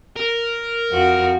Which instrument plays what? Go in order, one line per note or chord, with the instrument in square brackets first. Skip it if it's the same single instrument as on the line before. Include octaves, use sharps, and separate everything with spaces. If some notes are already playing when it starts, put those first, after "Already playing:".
[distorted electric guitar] A#4
[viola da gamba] F2 F#4